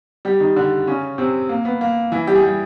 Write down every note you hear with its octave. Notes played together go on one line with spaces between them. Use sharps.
G3 G4
D#3 D#4
D3 D4
C#3 C#4
C3 C4
A#3
B3
A#3
E3 E4
G3 G4
G#4
G3 G4